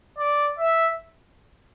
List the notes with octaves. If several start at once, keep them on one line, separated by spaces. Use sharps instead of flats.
D5
E5